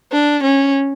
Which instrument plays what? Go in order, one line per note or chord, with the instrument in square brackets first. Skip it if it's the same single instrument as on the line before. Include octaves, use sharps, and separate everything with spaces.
[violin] D4
C#4